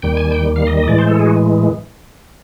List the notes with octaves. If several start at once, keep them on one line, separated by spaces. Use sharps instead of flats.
D#2 D#3 G3 G5
G#5
G5
F5
D#5
D#5
A2 E3 G#3 D5
C5
A4
G#4
F#4